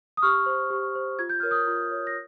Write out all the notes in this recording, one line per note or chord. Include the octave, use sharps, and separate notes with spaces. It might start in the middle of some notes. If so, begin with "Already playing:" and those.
D#6
G4 C#6 F6
C5
G4
C5
F4 G#6
G6
A#4 C#5 F6
D#6 G6
F4
A#4 C#5
A#6